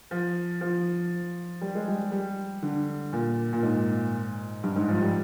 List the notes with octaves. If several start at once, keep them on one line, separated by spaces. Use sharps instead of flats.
F3
F3
G3
G#3
G3
G3
D3
A#2
A#2
G#2
G2
G#2
F3
G3